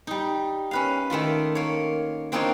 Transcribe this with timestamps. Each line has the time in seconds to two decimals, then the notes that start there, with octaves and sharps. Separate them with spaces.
0.07 G3 D#4
0.71 C#4 B4 F5
1.10 D#3 A3 A#3 F4
1.55 A#3 C#5
2.32 A#3 C4 D4 D#4 F4 C#5